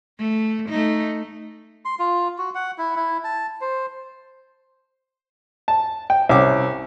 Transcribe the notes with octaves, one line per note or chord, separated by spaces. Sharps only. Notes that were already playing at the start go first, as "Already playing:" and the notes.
A3
A3 D#4
C6
F4
F#4
F#5
E4
E4
A5
C5
A5
G5
C2 C#4 D6